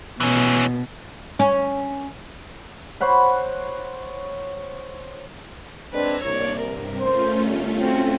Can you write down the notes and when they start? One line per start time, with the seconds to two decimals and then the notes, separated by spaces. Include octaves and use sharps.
0.20 B2 E3 C#4
1.39 C#4
3.01 C5 C#5 F#5 B5
5.93 G#3 C4 D4 B4 A#5 E6 G#6
6.22 C2 A#3 D4 C#5 D5
6.61 G2 C3 A#4
6.98 A3 C#4 F4 C5
7.43 G1
7.77 C4 F#4